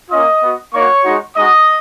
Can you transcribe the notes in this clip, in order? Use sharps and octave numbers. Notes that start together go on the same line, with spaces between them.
A#3 C#4 F4 D#5 D#6
B3 F#4
A#3 D#4 F#4 C#5 C#6
G#3 D#4 F#4
G#3 D#4 F#4 D#5 D#6